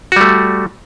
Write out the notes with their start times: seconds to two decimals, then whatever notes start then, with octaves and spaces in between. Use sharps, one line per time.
0.12 F#4
0.16 G3
0.21 A3